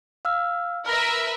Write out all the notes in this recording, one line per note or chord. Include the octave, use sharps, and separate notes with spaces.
F5 E6 F6
A#4 B4 E5 F6 A#6